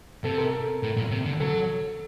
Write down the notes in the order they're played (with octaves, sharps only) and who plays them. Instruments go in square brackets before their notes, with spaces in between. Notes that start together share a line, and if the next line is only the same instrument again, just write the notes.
[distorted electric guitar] C3 [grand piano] A4
[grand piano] A#4
A4
[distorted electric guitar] A2
A#2
C3
D3
[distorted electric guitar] F#3 [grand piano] A4